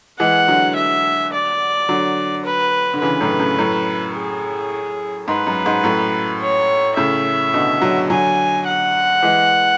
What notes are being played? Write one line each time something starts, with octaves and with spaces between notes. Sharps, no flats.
E3 G#3 F#5
D3 F#3
E5
D5
D3 F#3
B4
D3
C#3 E3 B4
F#2 A2
A2 C#3
F#2 A2
G#4
G#2 B4
F#2
G#2
F#2 A2
C#5
A2 C#3 E5
B2 D3
D3 F#3
D3 F#3 G#5
F#5
E3 G#3